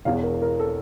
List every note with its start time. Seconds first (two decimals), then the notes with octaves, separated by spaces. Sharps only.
0.05 E1 E2 E3 F5
0.23 A#4
0.42 A#4
0.60 A4